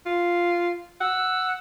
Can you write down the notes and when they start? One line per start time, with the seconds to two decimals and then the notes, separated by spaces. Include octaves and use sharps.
0.06 F4
1.01 F#5 E6